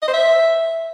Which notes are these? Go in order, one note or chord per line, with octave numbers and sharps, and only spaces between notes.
D#5
C5
E5